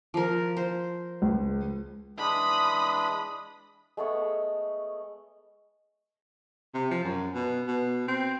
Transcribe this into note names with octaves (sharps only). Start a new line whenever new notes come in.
F3 A#4
C5
C#2
E3 G#3 D4 B5 D#6
G#3 A3 B3 C#5
C3
F3
F#2
B2
B2
C4